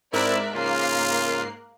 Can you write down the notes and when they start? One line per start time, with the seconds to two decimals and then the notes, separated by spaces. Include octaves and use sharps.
0.13 G#2 C4 E4 A#4 D5 E5 F#6
0.55 C#3 A#3 F4 C7